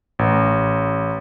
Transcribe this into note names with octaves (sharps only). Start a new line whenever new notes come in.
A1